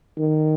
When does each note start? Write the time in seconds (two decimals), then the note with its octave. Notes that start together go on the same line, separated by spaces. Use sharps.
0.17 D#3